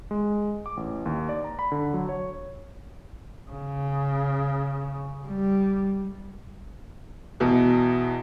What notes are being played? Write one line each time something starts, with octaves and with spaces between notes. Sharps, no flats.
G#3
D6
A1
D#2
D5
A#5
B5
D3
F#3
C#5
C#3
G3
E2 B2